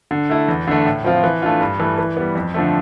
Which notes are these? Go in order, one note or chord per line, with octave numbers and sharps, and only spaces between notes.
D3
A3 E4
E2
D3 A3
A2
F3 C4 F4
E3
A3 D4 F4
G2
E3 A3 E4
E3
G3 B3
F2
D3 F3 A3